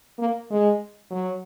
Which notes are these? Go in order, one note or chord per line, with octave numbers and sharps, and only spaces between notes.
A#3
G#3
F#3